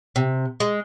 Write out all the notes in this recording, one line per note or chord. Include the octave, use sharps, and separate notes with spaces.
C3
G#3